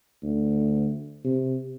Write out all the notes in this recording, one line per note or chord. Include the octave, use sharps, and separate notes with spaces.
D2
C3